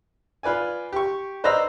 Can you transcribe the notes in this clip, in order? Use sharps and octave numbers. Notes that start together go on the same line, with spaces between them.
F4 B4 D5 G#5
G4 C#6
B4 C5 D5 D#5 A#5 E6